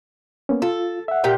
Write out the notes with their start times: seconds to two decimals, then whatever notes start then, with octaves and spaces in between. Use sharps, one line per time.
0.49 A#3 B3 C#4
0.62 F4 A4
1.08 E5 F#5
1.24 A#2 G4 G5